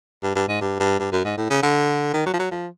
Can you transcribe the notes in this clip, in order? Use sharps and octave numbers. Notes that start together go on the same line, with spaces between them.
G2
G2
G#2
G2
G2
G2
F#2
G#2
A2
C#3
D3
D#3
F#3
F3
F#3
F3